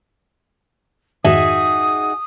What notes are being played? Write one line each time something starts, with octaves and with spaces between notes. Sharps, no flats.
F2 G#2 D#3 D#4 F#4 G#4 E5 D#6